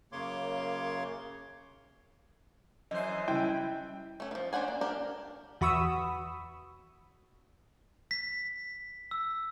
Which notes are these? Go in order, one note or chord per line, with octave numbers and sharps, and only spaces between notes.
F#2 C#3 A#3 C#5 C6 D6
F#2 E3 C5 D#5
C#3 G3 E4 G5
A3 C#4
D#3 F3
C#4 D4 C5 F#5 G#5
A#3
D4 G4 A#4
E2 F#4 B5 C#6 D#6 E6
B6
E6